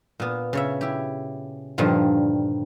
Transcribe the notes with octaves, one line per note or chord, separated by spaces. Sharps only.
A#2 B3
C#3 C#5 E5
E4 G4
G2 A#2 D3 D#3 F3 G3